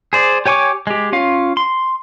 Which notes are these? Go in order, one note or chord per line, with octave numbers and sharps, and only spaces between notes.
G#4 C5 D5
G4 C#5 G#5 C#6 D6
G#3 G4
C#4 F4 F5
C6